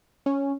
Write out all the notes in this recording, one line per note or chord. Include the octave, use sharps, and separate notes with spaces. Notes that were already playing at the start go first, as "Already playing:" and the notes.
C#4